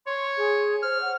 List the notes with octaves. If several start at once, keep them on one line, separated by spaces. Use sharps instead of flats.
C#5 C6
G#4
C5 F6
F#5